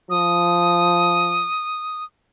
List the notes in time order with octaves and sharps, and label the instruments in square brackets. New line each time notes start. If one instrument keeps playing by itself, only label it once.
[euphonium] F3 [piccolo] D#6